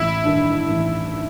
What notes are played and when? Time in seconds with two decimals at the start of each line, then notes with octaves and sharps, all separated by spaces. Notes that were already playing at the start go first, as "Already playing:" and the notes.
Already playing: A1 E4
0.24 G2 D#3
0.69 A1